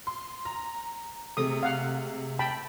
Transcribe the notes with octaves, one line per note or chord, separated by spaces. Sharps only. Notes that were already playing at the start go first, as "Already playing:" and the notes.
C6
A#5
C3 G#3 A3 D#6
F5 F#5
G5 A5 B5